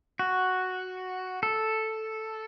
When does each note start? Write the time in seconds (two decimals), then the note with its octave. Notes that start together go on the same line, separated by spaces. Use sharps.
0.19 F#4
1.43 A4